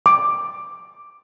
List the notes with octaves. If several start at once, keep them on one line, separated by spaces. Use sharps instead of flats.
D6